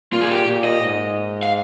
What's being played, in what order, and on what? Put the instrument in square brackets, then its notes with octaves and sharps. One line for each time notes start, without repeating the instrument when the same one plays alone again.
[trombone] A#2 [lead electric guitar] F4
[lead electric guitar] G#4
G4
[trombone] A#2
[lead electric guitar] D#5
[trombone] G#2
[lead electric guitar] F5